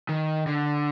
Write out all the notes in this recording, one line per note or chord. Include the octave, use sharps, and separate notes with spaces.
D#3
D3